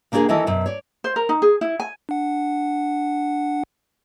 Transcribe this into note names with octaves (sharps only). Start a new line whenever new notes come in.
C#3 A#3 D4 F4 G#4 A#4
D#3 E3 E4 A4 D#5
F#2 B2
C#5 D5
C5
A#4
D#4
G#4
E4
G#5
D4 F#5